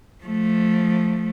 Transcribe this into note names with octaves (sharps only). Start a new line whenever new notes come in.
F3 A3